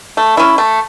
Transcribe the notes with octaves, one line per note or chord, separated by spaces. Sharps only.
A3
C#4 E4
A3